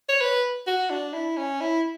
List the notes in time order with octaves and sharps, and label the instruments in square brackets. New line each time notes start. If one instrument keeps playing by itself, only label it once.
[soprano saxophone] C#5
B4
F#4
D4
E4
C#4
E4